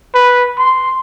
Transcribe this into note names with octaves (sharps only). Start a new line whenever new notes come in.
B4
C6